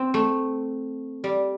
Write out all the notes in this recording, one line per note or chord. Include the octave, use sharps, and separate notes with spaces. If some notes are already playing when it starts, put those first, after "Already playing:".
Already playing: C4
A3
G3